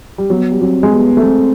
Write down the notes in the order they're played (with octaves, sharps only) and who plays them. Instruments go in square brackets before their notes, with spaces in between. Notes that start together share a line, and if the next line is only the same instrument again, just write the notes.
[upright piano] G3
[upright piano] F#3 [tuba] B3
[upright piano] G3
[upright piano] F#3 [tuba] C4
[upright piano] G#3
[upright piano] G3 [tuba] B3
[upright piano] A3
[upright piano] G#3 [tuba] C4